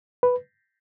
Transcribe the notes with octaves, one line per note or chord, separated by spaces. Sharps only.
B4